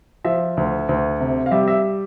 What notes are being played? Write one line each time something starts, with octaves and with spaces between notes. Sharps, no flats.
F3 E5
D2
D2
C3
F5
G3 E5
E5